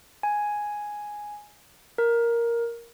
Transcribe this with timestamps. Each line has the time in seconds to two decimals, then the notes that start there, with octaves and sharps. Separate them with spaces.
0.23 G#5
1.98 A#4